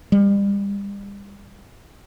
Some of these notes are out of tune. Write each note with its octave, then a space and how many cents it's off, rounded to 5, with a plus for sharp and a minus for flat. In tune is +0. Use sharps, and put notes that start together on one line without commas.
G3 +35